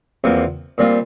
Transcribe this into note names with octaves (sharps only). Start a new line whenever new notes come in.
E2 C3 F3 A#3
A#2 G3 C4 F4